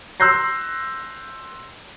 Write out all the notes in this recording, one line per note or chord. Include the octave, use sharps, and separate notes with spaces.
C6 E6 F#6 G6 A#6 C7